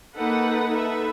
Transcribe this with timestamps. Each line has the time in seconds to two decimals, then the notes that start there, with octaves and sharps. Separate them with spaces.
0.15 A#3 D#4 A4 B4 F#5
0.69 D#4 A4 B4 E5